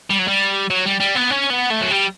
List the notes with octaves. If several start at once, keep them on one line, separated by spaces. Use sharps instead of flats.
G3
F#3
G3
F#3
G3
G3
B3
C#4
B3
A3
F#3
G3